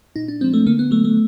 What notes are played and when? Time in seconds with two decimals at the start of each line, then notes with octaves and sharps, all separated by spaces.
0.16 A#2 D#4
0.28 D4
0.41 F3 G#3 C4
0.54 A3
0.67 D3 A#3
0.79 B3
0.91 F#3 A3
1.05 A3